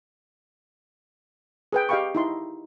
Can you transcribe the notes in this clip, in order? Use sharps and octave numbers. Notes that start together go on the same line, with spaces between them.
G#4 B4 G5
G4 D#5 F5 G5 B5 C#6
D#4 E4 C6